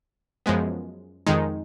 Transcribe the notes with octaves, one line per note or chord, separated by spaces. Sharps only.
F#2 F3 G#3 B3
F2 D#3 G#3 D#4